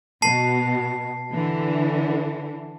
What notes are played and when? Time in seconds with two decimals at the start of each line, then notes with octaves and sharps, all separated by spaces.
0.22 B2 A5 C7
1.33 D3 E3